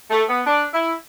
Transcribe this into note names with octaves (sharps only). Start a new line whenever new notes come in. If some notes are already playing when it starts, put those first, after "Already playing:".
A3
B3
D4
E4